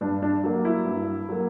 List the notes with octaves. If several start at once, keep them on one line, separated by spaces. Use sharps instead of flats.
G2 D4
D4
F#3 A#3
E4
G2
F#3 A#3